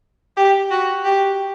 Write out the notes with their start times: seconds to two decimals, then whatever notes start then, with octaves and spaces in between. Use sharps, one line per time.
0.37 G4
0.71 F#4
1.05 G4